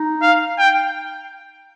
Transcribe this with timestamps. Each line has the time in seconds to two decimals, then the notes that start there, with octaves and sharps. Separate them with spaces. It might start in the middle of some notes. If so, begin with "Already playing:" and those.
Already playing: D#4
0.22 F5
0.58 G5